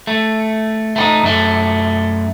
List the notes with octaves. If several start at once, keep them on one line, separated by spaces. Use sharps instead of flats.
A3
A3 B3 D#4
F#2 A3